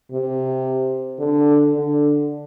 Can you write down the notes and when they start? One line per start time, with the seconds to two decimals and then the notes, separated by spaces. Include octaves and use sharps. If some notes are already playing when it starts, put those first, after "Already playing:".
0.12 C3
1.19 D3
1.73 D3